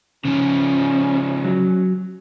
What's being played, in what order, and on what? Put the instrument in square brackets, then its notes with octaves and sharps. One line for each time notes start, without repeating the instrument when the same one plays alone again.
[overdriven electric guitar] C#3 F3 [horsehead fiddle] C#4
[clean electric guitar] F#3